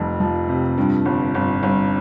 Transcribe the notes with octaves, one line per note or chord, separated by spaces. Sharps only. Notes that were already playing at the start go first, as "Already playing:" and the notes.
Already playing: F1 F2
F3
C3
G2
G1
G1
G1